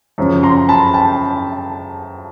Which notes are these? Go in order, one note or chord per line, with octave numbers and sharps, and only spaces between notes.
F#2 C#3 F3
A#5 C6
A5 B5
G5 A5